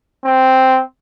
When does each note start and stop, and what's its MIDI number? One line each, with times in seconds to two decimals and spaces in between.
0.25 0.81 60